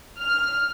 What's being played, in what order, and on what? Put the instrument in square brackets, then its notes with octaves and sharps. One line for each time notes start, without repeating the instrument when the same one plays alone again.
[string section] F6